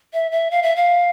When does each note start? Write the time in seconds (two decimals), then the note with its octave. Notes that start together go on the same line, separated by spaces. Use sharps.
0.13 E5
0.31 E5
0.51 F5
0.63 E5
0.76 F5